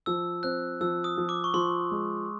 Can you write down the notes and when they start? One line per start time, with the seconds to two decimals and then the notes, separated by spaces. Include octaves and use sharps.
0.06 F3 E6
0.43 C4 F#6
0.81 F3 E6
1.04 D#6
1.17 F3
1.29 D6
1.44 C#6
1.54 F3 C6
1.91 G#3